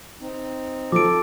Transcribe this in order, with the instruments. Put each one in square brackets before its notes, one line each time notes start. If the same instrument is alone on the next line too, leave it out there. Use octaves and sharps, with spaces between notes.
[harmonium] C4 D#4
[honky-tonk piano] F3 [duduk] A4 [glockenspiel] D6 D7